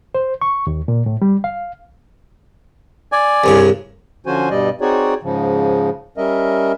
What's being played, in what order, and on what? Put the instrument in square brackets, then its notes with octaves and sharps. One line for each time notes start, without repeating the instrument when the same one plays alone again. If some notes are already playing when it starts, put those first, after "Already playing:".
[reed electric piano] C5
C#6
D#2
A#2
A2
G3
F5
[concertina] D5 G#5
[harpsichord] C2 G2 C#3
[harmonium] D3 F3 C#4 F#4 C5 G#5
G2 B2 G3 D5 D#5
C4 D#4 F#4 G#4 C#5 D5
G#2 C#3 F3
G3 C#4 A#4 D#5 E5